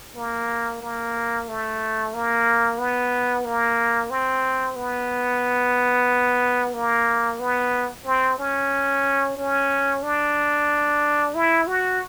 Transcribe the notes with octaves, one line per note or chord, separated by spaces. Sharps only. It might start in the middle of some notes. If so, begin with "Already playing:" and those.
A#3
A#3
A3
A#3
B3
A#3
C4
B3
A#3
B3
C4
C#4
C#4
D4
E4
F#4